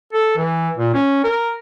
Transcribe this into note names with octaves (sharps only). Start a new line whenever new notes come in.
A4
E3
A#2
C#4
A#4